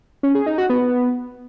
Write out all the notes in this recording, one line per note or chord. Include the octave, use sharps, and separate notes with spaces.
C#4
G#4
D#4
F#4
B3